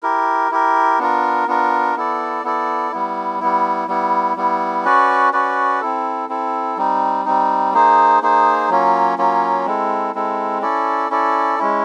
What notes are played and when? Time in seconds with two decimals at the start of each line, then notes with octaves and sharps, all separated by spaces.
0.03 E4 G4 A#4
0.51 E4 G4 A#4
0.99 B3 D4 F4 A#4
1.48 B3 D4 F4 A#4
1.96 B3 E4 A4 D5
2.44 B3 E4 A4 D5
2.92 G3 B3 E4
3.40 G3 B3 E4
3.88 G3 B3 E4
4.36 G3 B3 E4
4.85 C#4 F#4 B4 D5
5.33 C#4 F#4 B4 D5
5.81 C4 E4 A4
6.29 C4 E4 A4
6.77 G3 C4 D#4
7.25 G3 C4 D#4
7.73 A#3 D#4 G#4 C5
8.22 A#3 D#4 G#4 C5
8.70 F#3 A#3 C#4 F4
9.18 F#3 A#3 C#4 F4
9.66 G#3 C4 E4 A4
10.15 G#3 C4 E4 A4
10.62 C#4 E4 A4 D5
11.10 C#4 E4 A4 D5
11.59 G#3 C#4 E4